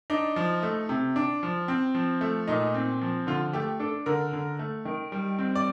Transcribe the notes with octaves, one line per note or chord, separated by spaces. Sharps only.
D4 D#4
F3
A3
C3
D4
F3
C4
F3
A3
A#2 D#4
C4
F3
D3 F4
A3 G4
D4 A4
D3 A#4
D3
A3
D#3
G3
C4
D5